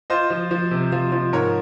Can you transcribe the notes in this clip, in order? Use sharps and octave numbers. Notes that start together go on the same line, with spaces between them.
F4 C5 D#5
F3
F3
C3
F3
F3
G#2 A#4 C#5